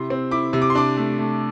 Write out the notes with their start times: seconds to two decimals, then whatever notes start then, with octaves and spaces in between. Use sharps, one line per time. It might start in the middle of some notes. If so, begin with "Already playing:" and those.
Already playing: C3 E4 C6
0.10 C4
0.31 E4 D6
0.53 C3
0.62 D6
0.70 C6
0.75 D4 D6
0.97 A3
1.19 A3